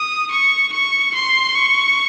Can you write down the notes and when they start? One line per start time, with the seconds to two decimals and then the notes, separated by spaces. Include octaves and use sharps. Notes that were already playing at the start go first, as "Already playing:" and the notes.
Already playing: D#6
0.31 C#6
0.72 C#6
1.14 C6
1.55 C#6